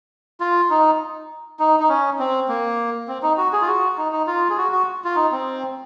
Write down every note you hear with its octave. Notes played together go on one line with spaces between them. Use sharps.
F4
D#4
D#4
D#4
C#4
C4
A#3
C4
D#4
F#4
G#4
F4
F#4
D#4
D#4
F4
G#4
F#4
F#4
F4
D#4
C4